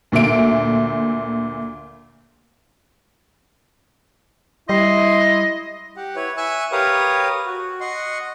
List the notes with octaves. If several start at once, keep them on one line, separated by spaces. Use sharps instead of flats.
D2 A#2 E5 D7
G3 E4 D#5 C6
G4 F#5
E4 B4 C#5
E5 G#5 C#6 E6 F#6
G4 A#4 B4 C#5 F5 D#6
F#4
D#5 F#5 C6 C#6